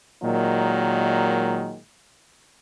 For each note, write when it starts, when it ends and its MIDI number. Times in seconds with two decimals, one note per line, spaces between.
0.22 1.78 46
0.22 1.78 51
0.22 1.78 54
0.22 1.78 56